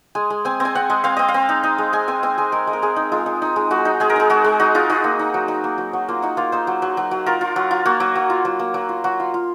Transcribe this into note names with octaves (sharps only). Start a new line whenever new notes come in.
G#3 G#5
G#3
C4 G#5
C4
G#5
C4 F#5
G#3
C4 F5
C4 D#5
F5
C4
D#4
D#4
G#3
G#3 G#5
C4 G#5
C4 G#5
G#3 G#5
G#3 A#4
G#3
A#4
G#3 G#4
D#4
G#3 F4
D#4
D#4
G#3
G#3 F#4
D#4
G#3 G#4
A#4
D#4 G#4
G#3 F#4
G#3
D#4 F#4
D#4 F4
D#4 F#4
A#3
D#4
F#3
D#4
A#3
F#3
F#3
A#3 F4
D#4 F#4
A#3 F4
D#4 C5
F#3
F#3
F#3
F#3
F4 A#4
F4
F#3
F4
A#3 F#4
F#3
F#3
F4
F#3
A#3
F#3
F4
F#3 F#4
F4
F4